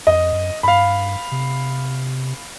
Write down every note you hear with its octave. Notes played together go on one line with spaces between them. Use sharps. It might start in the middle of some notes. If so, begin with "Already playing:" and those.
F2 D#5
F#2
G2 F5 B5
C3